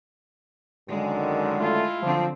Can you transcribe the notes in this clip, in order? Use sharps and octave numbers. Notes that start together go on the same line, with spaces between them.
F#2 D3 D#3 G#3
A3 E4 F4
D3 F3 F#3 C4